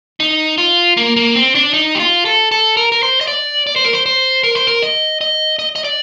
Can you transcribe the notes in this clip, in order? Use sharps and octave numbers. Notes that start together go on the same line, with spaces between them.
D#4
F4
A#3
A#3
C4
D4
D#4
G4
F4
A4
A4
A#4
A#4
C5
D#5
D5
D5
C5
A#4
C5
C5
A#4
C5
A#4
D#5
D#5
D#5
D#5
D5